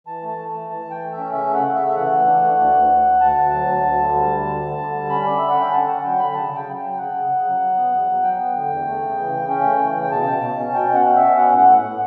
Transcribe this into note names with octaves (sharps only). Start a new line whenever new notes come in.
E3 A5
A3
A5
A3
A5
E3
E3 A5
E3
G5
A3
E5
C#4
C#3 E5
A3
F#5
C#3
E5
A3
E5
E3 F#5
E3
D4
A3
D2
D2
D2
D2
D2 A5
D2
F#3
D2
D2
D3
G3
D2
D3
D3
D3
G3
C#4 B5
D3 D5
D3 E5
F#5
C#4 G5
D3 A5
C#4 F#5
F#3 G5
D3 B5
C#3 A5
C#3
G5
F#3
F#3 G5
C#3 F#5
C#3
C#3
F#3
F#3
B3
E2
F#3
F#3 G5
B3
D3
E2
A3
C#3
E3
C#3
C#4 G5
A3
E3
C#3
G5
B2 A5
B2
B2
C#4
B2 G5
B2
F#5
C#4
E5
C#4
B3 F#5
A2
F#5
A2
A2 F#5